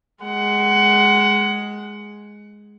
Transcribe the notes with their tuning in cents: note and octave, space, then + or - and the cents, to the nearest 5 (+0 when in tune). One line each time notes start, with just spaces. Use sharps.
G#3 +0 F#5 +20